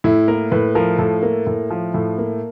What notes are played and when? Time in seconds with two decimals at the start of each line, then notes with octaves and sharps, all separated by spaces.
0.04 A2 E4
0.28 A#3 A#4
0.51 A2 B4
0.75 F3 A#4
0.99 A2 A4
1.23 A#3
1.47 A2
1.70 F3
1.94 A2
2.18 A#3